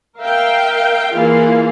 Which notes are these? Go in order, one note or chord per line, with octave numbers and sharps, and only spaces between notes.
A#4 E5 F5 G5
E3 A#3 E4 F4 G#4 F5